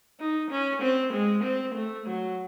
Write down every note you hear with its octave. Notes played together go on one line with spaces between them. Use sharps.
D#4
C#4
C4
G#3
C4
A3
F#3